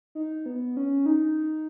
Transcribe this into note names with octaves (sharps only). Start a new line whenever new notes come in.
D#4
B3
C#4
D#4